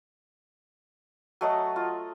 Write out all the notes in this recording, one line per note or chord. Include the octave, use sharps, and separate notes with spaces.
F#3 A3 D#5
F4